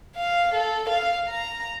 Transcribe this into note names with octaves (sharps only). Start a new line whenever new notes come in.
F5
A4
F5
A#5